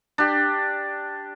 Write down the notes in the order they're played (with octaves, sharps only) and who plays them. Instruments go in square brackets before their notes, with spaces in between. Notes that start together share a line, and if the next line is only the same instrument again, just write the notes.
[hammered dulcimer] D4 G4